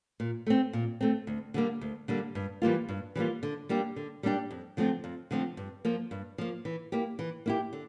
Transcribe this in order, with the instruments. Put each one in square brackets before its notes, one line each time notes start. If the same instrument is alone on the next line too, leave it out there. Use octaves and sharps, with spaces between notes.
[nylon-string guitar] A#2
A3 C4
A#2
A3 C4
D2
D3 G3 A#3
D2
D3 G3 A#3
G2
E3 G3 A#3 F4
G2
E3 G3 A#3 F4
D3
G3 A#3 D4 G4
D3
G3 A#3 D4 G4
F2
D3 F3 A3 C4
F2
D3 F3 A3 C4
G2
F3 A#3
G2
F3 A#3
E3
A#3 E4 G4
E3
A#3 E4 G4
D3